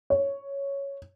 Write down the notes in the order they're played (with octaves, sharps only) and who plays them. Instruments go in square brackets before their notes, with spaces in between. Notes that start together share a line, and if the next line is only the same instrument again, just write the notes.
[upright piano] C#5